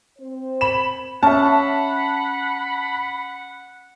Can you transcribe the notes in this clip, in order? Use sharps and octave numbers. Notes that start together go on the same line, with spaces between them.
C4 C5
B5 E7
C#4 E5 F#5 A5 B5